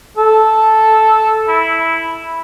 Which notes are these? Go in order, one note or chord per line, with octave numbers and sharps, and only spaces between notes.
A4
E4